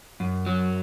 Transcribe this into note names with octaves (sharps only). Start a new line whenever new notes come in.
F#2
F#3